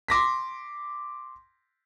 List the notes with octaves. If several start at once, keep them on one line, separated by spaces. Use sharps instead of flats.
C6 D6 A#6 B6